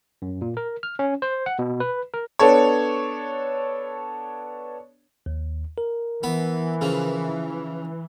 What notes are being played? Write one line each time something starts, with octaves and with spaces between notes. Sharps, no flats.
F#2
A#2
A#4
F6
C#4
C5
F#5
B2
B4
A#4
B3 D4 A4 C#5
D#2
A#4
E3 B3 B5
C#3 F3